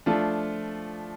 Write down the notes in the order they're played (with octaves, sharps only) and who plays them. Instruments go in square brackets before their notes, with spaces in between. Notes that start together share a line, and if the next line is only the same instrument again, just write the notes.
[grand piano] F3 A3 D4 F4